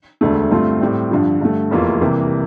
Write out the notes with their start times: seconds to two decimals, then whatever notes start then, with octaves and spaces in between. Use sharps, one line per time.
0.21 E1 D2 D3 A3
0.51 G2 D3 A3 C4 F4
0.81 A2 G3 C4
1.11 G2 D3 F3
1.41 G2 D3 A3
1.71 F1 E2 E3 A#3 F4
2.01 C2 C3 E3 A#3